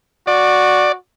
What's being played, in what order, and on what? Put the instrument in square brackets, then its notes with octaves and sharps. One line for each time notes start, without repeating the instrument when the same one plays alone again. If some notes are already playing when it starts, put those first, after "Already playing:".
[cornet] F#4 [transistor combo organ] D5